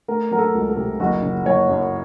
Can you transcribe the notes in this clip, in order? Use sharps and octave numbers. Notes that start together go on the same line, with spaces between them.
A3 A#4
F#3 A#4
A4
C#2
A4
C3
F#1 F#4
C#3
F#1 C#5
F#2